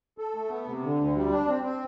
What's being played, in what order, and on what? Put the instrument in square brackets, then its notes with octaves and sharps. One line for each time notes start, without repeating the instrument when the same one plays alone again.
[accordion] A4
A3
B3
C3
D3
D2
G3
D4
C4
C4